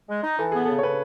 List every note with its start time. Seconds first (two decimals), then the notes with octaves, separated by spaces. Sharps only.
0.09 G#3
0.24 D#4
0.39 E3 A4
0.52 B3 G#4
0.65 C#3 A4
0.79 C#5
0.83 C#3 B4